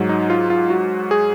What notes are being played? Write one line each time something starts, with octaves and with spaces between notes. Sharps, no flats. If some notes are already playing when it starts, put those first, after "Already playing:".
Already playing: G#2 F#3
D#4
F4
F4
F#4
G#4